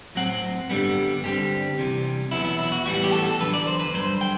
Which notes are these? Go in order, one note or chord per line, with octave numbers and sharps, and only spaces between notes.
A2 F#3 C4 F#5
G2 D3 G3 B3
G2 D3 G3 C4 G4
C2 C3 E3 G3
E2 B2 F#3 B3 E4
E4
E4
F#4
A2 E3 G3 B3 F#4
G4
A4
A4
E2 D3 F#3 B4
D5
C5
B4
G2 D3 F#3 C5
G5